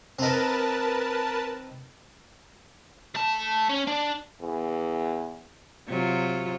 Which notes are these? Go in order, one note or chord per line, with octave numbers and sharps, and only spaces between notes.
C4 D#4 A#4 B4 A5
A3 A5
C#4
D4
E2
C3 F#3 F4